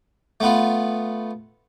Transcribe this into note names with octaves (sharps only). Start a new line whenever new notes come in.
A3 B3 F4